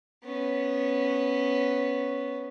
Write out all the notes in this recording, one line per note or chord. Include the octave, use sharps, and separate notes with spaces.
B3 C#4